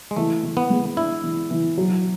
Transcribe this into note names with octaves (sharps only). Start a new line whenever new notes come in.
G#3
E3 A3
E3
B3
G#3
D4 E4
E3
E3
F#3